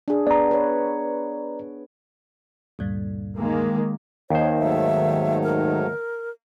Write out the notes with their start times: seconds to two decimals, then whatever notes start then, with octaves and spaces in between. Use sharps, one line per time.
0.08 D4 G#4
0.27 B3 D5 A#5
0.51 B4 C#5
2.79 D2 G2 A#2
3.35 D#3 G#3 A#3
4.30 D#2 D#3 C5 C#5
4.59 G#2 F#3 A3 E5
5.44 A#4